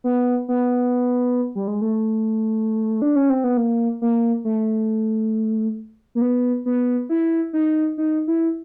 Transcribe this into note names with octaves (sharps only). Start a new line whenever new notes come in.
B3
B3
G3
G#3
A3
D4
C#4
C4
B3
A#3
A#3
A3
A#3
B3
B3
E4
D#4
D#4
E4